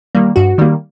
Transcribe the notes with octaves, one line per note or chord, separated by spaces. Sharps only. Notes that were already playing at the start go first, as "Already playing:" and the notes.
D#3 G3 A#3
G2 F#4
D#3 G3 A#3